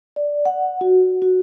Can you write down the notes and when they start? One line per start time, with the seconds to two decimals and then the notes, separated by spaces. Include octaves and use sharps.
0.16 D5
0.45 F#5
0.81 F#4
1.22 F#4